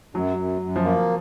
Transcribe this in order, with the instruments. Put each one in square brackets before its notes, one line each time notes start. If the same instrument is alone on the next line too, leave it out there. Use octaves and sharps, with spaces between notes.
[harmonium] F#2 [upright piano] F#3
[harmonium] F#2
F#2
[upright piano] F3
[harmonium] A#3